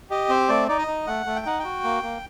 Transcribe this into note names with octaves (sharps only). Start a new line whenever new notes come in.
G4 D#5
C4 C5
A3 D5
D#4 D5
D#5
D#4
A3 F#5
A3
G5
D#4 F#5
F#4 G5
A#3
A#3